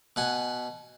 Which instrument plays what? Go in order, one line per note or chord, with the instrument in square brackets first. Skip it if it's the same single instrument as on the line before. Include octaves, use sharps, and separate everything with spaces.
[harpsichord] B2 F#5 G#5